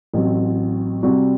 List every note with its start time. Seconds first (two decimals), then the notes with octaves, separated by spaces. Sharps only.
0.14 A1 A2 F#3 C4
1.03 C3 G3 C4 F#4